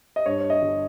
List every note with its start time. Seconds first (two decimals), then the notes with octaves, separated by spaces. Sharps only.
0.16 D#5
0.26 G2 C#5
0.40 C#5
0.50 D#5
0.62 G1